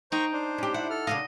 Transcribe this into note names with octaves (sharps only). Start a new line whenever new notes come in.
D#4 C5 G5 A#5 C#6
D4 C5
C#4 G4
E4 F#5
A4 F6
C#3 D4 F4 D#5